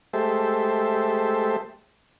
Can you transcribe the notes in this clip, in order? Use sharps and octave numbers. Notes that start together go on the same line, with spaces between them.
G#3 A3 G4 A4 C5 E5